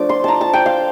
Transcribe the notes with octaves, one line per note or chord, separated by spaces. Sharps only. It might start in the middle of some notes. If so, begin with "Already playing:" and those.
Already playing: F3 A3 D4 D6
C6
A5 A#5
A5
G5
F5